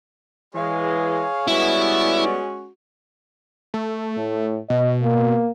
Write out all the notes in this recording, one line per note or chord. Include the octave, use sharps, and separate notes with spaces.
E3 G#3 G#4 C#5 F5
G3 G#3 B3 C#4 E4 F#4 D5
A3
A2
B2 D#5
A#3